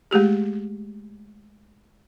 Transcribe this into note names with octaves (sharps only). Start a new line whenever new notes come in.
G#3 A3 G4 G#4